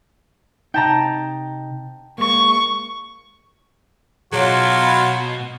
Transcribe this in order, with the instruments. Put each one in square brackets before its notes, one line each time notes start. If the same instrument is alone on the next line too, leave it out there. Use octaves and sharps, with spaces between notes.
[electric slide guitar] C3 D#4 [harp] G5 A5 A#5
[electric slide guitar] G#3 A#3 [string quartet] C#6
[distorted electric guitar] B2 [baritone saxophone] F#3 [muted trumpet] F4 [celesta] G#4 C#5 D7
[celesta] B5